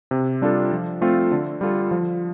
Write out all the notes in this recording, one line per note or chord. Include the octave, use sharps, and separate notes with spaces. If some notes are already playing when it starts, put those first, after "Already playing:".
C3
G3 D4 F4 A4
F3
A3 C4 F4 A4
D3
G3 F4 A4
F3